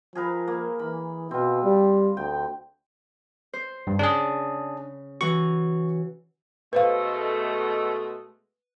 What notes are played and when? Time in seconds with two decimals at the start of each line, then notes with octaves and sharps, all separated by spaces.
0.15 F3 G#4 A#4 B4
0.48 A#3
0.79 E3 B5
1.31 B2 C4 F4
1.63 G3
2.17 D2 G5
3.53 C5
3.87 G2
3.99 C#3 D4 G#4
5.21 E3 F#4 C#6
6.73 B2 G#3 A3 B4 C5 F5